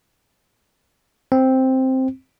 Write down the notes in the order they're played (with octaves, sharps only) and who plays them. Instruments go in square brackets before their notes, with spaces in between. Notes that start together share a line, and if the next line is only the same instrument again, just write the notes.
[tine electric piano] C4